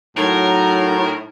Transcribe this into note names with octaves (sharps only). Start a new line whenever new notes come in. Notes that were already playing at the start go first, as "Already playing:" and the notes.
A2 F#3 D#4 A#4